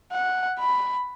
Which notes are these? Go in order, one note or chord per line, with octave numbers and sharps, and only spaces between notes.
F#5
B5